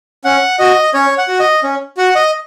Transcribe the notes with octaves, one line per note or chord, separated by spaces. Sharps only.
C#4 F#5
F#4 D#5
C#4 C#5
F#5
F#4
D#5
C#4
F#4 F#5
D#5